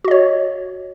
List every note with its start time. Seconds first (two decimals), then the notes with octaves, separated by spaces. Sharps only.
0.04 F#4
0.08 D#5
0.11 C#5